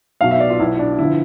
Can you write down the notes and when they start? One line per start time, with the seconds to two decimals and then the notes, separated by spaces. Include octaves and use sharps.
0.21 B1 B2 F5
0.31 E5
0.40 D5
0.50 F4
0.59 B1 B2 E4
0.79 D4
0.98 G1 D3 F3 E4